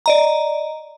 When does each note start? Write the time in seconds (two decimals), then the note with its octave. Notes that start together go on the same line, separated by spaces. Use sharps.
0.06 D5 D#5 A#5